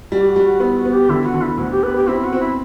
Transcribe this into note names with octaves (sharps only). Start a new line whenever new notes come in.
G3 F#4
G4
F#4
G3
F#4
B3 E4
F#4
B3
G4
D3 E4
F#4
D3
E4
D2 F#4
G4
B3 B4
G4
C4 E4
F#4
C4
E4